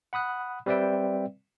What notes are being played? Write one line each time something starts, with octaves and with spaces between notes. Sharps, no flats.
F#5 B5 D#6 F#6
G3 C4 B4 D5 E5 G5